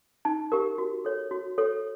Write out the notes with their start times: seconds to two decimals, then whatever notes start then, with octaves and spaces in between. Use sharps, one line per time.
0.25 D#4 A5
0.52 G4 A#4
0.78 F#4
1.05 A4 C#5
1.31 F#4
1.58 A4 C#5